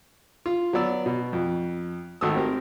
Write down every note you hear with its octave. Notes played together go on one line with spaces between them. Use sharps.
F4
F#3 B3 D5 E6
B2
F2
G#1 A3 F#4 D#6 E6
C4 G4 A#4